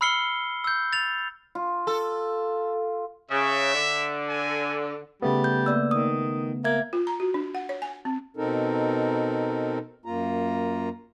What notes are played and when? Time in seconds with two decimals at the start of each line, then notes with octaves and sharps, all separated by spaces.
0.01 B5 E6 F6 C7 C#7 G7
0.64 E6 G6
0.93 A6 F7
1.55 F4
1.87 A4
3.31 C#3 E5
3.73 D3
4.29 G#5
5.22 C#3 G3 A3 B3
5.44 G6
5.66 A#3 D5 E6
5.91 D#3 D#6
6.64 A#3 E5 G#6
6.93 F4
7.07 A#5
7.20 F#4
7.34 D4
7.55 F#5
7.69 C#5
7.82 G#5
8.05 C4
8.37 B2 C4 D#4 A4 A#4
10.05 F#2 A#3 F4 A#5